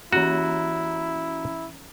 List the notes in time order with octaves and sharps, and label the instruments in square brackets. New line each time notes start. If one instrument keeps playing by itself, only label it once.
[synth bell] E3 C#4 A#5 [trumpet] E4 [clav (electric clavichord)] F#4